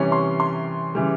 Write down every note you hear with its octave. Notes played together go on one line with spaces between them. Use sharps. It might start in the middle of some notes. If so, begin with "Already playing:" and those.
Already playing: C3 E3 G3 C#4 C#6
C6
C6
C#3 E3 G3